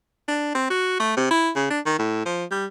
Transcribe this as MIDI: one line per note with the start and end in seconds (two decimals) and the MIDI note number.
0.28 0.53 62
0.55 0.66 60
0.70 0.99 66
1.00 1.16 57
1.17 1.30 48
1.31 1.50 64
1.55 1.69 49
1.70 1.80 62
1.86 1.98 51
1.99 2.24 45
2.26 2.45 53
2.51 2.66 55